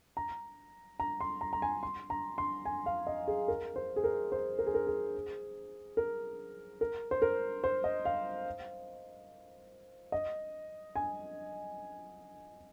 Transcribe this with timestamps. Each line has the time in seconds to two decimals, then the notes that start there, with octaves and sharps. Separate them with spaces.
0.17 A#5
1.00 A#5
1.21 C6
1.41 A#5
1.53 A#5
1.62 G#5
1.83 C6
2.10 A#5
2.38 C6
2.65 G#5
2.86 F5
3.07 D#5
3.28 G#4
3.48 A#4
3.76 C5
3.96 G#4
4.04 A#4
4.32 C5
4.59 A#4
4.66 G#4
4.74 A#4
4.87 G#4
5.97 A#4
6.81 A#4
7.11 C5
7.22 A#4
7.64 C5
7.84 D#5
8.05 F5
10.12 D#5
10.96 G#5